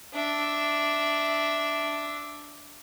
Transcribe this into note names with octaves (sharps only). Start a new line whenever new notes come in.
D4 E5